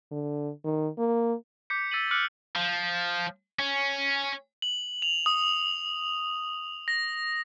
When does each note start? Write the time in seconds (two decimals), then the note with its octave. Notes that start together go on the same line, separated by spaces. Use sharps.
0.11 D3
0.64 D#3
0.98 A#3
1.70 D6 G6 B6 C#7
1.91 E6 A6 B6 D#7 F#7
2.11 D6 F6 F#6 C#7 D7 F#7
2.56 F3
3.59 C#4
4.62 F#7
5.02 F7
5.26 D#6
6.88 A#6